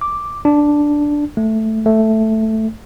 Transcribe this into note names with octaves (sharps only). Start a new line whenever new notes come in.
D6
D4
A3
A3